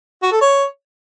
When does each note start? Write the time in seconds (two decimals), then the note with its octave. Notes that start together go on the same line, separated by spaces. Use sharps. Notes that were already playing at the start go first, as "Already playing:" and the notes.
0.23 F#4
0.32 A4
0.41 C#5